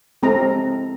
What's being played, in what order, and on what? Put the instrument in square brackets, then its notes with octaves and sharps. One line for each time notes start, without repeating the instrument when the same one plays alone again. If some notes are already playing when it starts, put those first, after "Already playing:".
[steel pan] G#3 C4 E4 A4 A#5